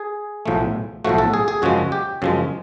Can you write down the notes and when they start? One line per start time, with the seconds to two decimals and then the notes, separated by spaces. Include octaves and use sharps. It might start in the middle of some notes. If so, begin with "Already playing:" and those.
Already playing: G#4
0.46 B1 A2 F3 A3
1.05 B1 A2 F3 A3 F#4
1.18 A4
1.34 G#4
1.48 G#4
1.62 F#2 C#3 F3 G#3 F#4
1.92 G4
2.22 F#2 C#3 F3 G#3